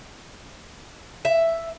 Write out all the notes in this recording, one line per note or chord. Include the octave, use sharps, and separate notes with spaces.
E5